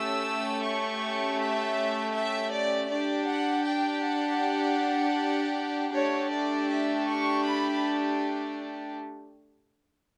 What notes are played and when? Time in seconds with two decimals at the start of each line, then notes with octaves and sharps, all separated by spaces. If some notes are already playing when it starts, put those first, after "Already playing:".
Already playing: A3 C#4 G4 E6
0.64 C#6
1.39 E5
2.15 E5
2.53 D5
2.90 D4 G4 D5
3.28 F#5
3.66 G5
4.04 F#5
5.93 A3 D4 G4 C#5
6.31 D5
6.69 E5
7.07 C#6
7.44 B5